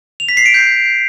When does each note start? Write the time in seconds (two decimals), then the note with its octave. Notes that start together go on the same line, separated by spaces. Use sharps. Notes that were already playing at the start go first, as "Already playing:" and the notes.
0.20 F7
0.29 B6
0.37 C7
0.46 D7
0.54 G6